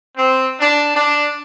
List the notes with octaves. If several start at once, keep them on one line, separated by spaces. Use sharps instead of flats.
C4
D4
D4